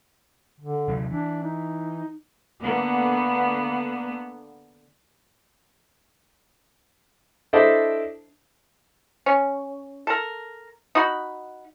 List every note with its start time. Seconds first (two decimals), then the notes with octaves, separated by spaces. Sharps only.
0.60 D3
0.88 C3 F#3
1.11 E3 D4
1.43 D#4
2.62 D3 A#3 B3
7.53 D4 E4 A4 C5 D#5 E5
9.26 C#4
10.07 A4 A#4
10.95 D#4 F#4 B5